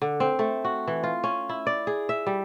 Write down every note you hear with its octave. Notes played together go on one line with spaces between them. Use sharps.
D3
C4
A3
F#4
E3
F4
C#4
E4
D5
G#4
E5
G3